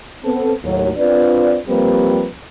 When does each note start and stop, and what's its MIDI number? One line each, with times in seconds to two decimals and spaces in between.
0.24 0.52 59
0.24 0.52 60
0.24 0.52 69
0.64 0.90 39
0.64 0.90 45
0.64 0.90 54
0.98 1.58 60
0.98 1.58 62
0.98 1.58 65
0.98 1.58 71
0.98 1.58 74
1.68 2.27 53
1.68 2.27 55
1.68 2.27 58
1.68 2.27 60
1.68 2.27 67
1.68 2.27 71